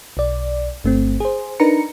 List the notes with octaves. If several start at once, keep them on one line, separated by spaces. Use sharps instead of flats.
B1 D5
G1 A3 C4
G#4 C5
D4 D#4 A#4 B4 A#5 C#7